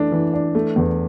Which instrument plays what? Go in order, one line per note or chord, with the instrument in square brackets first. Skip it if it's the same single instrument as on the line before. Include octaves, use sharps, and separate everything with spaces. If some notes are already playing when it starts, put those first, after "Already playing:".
Already playing: [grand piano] E3 A3 D4
E3
D4
A3
E2